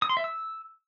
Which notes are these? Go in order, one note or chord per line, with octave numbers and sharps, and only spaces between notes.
D#6
C6
E5
E6